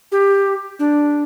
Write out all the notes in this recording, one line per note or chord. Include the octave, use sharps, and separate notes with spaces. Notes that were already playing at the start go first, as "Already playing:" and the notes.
G4
D4